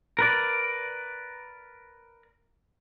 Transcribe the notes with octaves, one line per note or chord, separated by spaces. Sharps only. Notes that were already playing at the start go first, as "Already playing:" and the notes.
A#4 B4 D5